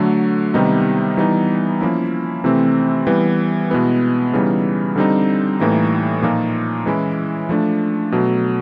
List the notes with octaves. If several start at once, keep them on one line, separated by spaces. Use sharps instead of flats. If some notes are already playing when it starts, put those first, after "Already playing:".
Already playing: D3 F#3 A3
C3 D#3 G3 B3 D#4
E3 G3 B3 D#4
F3 A#3 C#4 E4
C3 E3 A3 C4
E3 G3 B3
B2 G#3 B3 E4
C#3 E3 G3 B3 D#4
D3 G3 C4 D#4
A2 E3 G3 A#3 D#4
A#2 F3 A#3 D#4
E3 G#3 C#4 E4
F3 A3 D4
B2 F#3 A3